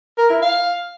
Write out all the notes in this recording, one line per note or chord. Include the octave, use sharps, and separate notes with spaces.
A#4
E4
F5